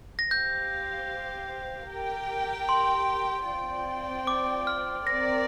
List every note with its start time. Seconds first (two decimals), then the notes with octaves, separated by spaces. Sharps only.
0.19 A#6
0.31 G4 C5 F5 G6
1.89 G4 A#4 G5
2.69 C6
3.48 C4 F4 D5 G5
4.27 D6
4.67 F6
5.07 C4 A#4 D5 A#6